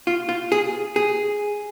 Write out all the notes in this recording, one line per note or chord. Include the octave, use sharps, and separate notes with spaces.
F4
F4
G#4
G#4